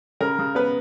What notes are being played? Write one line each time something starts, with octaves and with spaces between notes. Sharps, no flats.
C#3 A#4
C#3
B3 B4